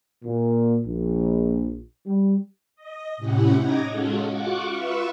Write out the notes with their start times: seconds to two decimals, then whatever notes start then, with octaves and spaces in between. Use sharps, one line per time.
0.25 A#2
0.87 A#1
2.07 G3
2.76 D#5
3.17 A2 C3 C#4 E4 G4 F#5
3.58 D#4 D#5 A#5 D6 G#6 A#6
3.88 G#3 C#4 F4 F#4 G#4 A4
4.27 F4 F#4 C#6 D6 F#6
4.69 F4 B4 E5 C#6 E6